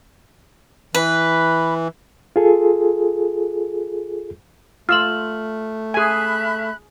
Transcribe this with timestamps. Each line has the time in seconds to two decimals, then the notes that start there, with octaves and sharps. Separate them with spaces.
0.95 E3 B4
2.36 F4 G#4 A4
4.89 A3 F4 E6 F6 F#7
5.94 G#4 E5 G#5 B5 F#6